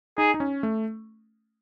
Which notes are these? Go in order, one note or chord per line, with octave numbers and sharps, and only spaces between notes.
D#4 G#4
D#4
C#4
A3